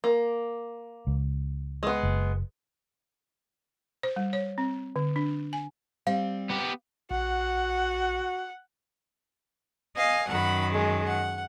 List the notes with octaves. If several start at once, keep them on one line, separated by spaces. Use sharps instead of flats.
A#3
C#2
G#3 B3
F#1
C5
G3
C#5
C4
D3
D4
G#5
G3 C4 F5
B3 G4
A#1 F#4 F#5
D#5 F5 G#5
F#2 D#3 F#5 B5
G#3
F#5